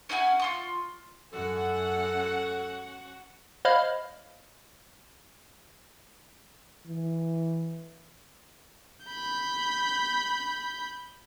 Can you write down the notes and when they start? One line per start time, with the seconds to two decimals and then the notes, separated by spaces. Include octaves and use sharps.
0.09 C#4 E4 F#4 G#5
0.40 F4 C6 C#6
1.33 F#2 C#4 F#4 A4 F#5
3.65 C5 C#5 D#5 F5 B5 F6
6.87 E3
9.06 B5 G6